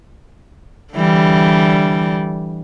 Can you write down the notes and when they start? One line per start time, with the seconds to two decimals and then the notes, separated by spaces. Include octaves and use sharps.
0.94 D3 E3 G3